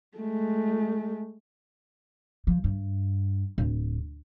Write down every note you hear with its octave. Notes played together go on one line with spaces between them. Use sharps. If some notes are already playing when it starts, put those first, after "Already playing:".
G#3 A3
F3
G2
D1